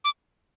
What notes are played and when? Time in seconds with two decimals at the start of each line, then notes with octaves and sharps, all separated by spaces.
0.04 D6